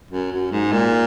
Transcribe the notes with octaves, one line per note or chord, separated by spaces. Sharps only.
F#2
F#2
G#2
A#2